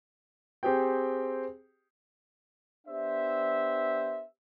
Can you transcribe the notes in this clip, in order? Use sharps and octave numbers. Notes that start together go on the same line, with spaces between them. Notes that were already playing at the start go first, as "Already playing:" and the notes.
C4 G4 G#4 C5 G5
B3 D4 G4 C5 E5